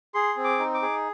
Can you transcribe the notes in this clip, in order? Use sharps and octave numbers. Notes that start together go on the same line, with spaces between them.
G#4 C6
C4
D6
D#4
D6
G#4